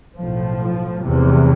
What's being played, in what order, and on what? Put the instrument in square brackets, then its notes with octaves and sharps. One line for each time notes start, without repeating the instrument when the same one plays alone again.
[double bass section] B1 A2 F3
F1 E2 C3